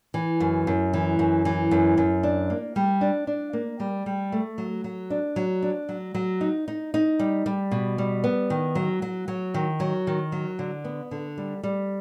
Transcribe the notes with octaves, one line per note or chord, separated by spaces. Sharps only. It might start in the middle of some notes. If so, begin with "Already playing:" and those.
E3
F#2
F#2
E3
F#2
E3
F#2
F#2
D4
A#3
G3
D4
D4
A#3
G3
G3
A3
F#3
F#3
D4
F#3
D4
F#3
F#3
D#4
D#4
D#4
G3
G3
B2
G3
B3
D#3
F#3
F#3
F#3
D#3
F#3
D#3
F#3
D3
B3
D3
G3
G3